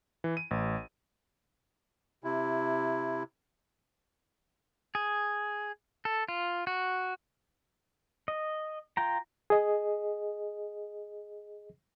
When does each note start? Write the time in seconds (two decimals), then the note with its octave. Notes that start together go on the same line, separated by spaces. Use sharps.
0.24 E3
0.37 D#7
0.51 A1
2.24 C3 E4
4.95 G#4
6.05 A4
6.28 F4
6.67 F#4
8.28 D#5
8.97 F4 G5 A#5
9.50 G#4 D#5